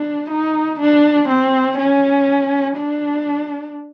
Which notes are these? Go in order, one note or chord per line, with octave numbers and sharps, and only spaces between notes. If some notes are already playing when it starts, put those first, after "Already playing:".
Already playing: D4
D#4
D4
C4
C#4
D4